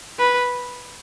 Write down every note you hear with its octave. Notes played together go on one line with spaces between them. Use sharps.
B4